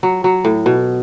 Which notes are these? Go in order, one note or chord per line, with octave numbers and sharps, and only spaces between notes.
F#3
F#3
A2
B2